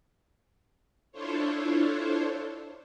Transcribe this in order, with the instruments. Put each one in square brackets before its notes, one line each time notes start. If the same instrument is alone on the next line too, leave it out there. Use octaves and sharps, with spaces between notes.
[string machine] D4 E4 F4 A4 C5 C#5